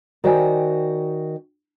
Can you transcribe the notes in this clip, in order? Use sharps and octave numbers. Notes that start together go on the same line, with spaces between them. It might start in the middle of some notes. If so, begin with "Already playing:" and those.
D#3 F#4 C5 D5 G5 G#5